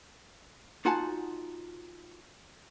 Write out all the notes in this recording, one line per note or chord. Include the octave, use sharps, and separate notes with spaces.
D#4 F4 F#4 F#5 G#5 A5